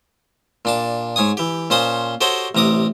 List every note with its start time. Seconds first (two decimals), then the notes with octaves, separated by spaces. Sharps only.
0.65 A#2 D4 A5
1.16 G#2 C#5 G#5 D#6
1.37 E3 G4
1.70 A#2 C#4 C5 A5 D#6
2.21 F#4 G4 A4 C5 C#5 D#5
2.55 A1 C3 A#5 D6 D#6